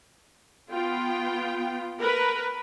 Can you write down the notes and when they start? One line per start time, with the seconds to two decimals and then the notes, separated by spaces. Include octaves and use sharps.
0.71 B3 F4 G5
2.02 A#4 B4